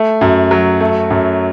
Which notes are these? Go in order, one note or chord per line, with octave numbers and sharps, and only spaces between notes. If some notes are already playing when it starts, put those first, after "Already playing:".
Already playing: A3
F#2
F#3
A3
F#2